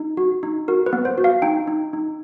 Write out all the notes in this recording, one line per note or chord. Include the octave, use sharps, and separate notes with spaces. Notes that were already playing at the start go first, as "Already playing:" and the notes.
Already playing: D#4
F#4
D#4
F#4 A#4
B4
B3
C5
F#4
F5
D#4 G5
D#4
D#4